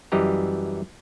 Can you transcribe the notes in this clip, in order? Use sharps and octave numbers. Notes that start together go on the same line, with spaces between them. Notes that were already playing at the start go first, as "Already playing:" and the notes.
F#2 E3 G3 G4 D#5 A#5